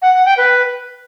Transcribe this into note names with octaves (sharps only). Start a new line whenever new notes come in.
F#5
F#5
G5
B4